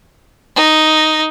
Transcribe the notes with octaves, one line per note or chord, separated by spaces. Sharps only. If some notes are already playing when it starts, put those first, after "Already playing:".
D#4